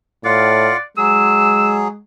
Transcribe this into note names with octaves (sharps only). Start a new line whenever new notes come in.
A2 F4 D5 F5 F#5
F#3 G#3 G#4 E6